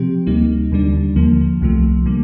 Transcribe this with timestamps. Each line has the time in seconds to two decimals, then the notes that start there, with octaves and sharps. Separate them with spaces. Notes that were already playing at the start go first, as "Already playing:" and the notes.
Already playing: C3 F3 C4 G4
0.27 D2 C3 G3 A#3 D#4
0.72 D#2 D3 G3 D4
1.16 D#2 D3 F3 A#3
1.61 C2 C3 F3 A3
2.06 D3 G3 A#3